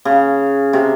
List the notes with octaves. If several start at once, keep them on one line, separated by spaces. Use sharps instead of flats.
C#3
C3